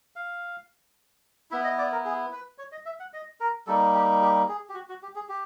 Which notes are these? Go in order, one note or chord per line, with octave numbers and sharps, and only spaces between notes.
F5
B3 E4 E5
D#5
D5
A#4
G#4
B4
C#5
D#5
E5
F#5
D#5
A#4
G3 A#3 D#4 A4
G4
G4
G#4
G4
F#4
F#4
G4
G#4
G4